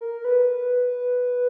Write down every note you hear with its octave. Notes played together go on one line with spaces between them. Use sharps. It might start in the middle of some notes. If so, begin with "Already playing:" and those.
A#4
B4